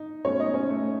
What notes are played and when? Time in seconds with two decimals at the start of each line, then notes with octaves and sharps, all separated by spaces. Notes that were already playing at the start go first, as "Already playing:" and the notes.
Already playing: D#4
0.24 B2 F#3 A3 C#4 C#5
0.39 D#4 D#5
0.54 C#4 C#5
0.69 A3 A4